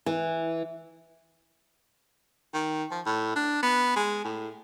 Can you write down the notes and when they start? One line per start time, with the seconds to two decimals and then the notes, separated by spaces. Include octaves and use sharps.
0.06 E3
2.54 D#3
2.91 F3
3.06 A2
3.36 D4
3.63 B3
3.96 G#3
4.25 A2